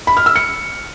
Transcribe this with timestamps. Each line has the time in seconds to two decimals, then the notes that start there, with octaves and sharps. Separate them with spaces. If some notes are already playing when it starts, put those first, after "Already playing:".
0.07 B5
0.17 F6
0.26 E6
0.36 C#7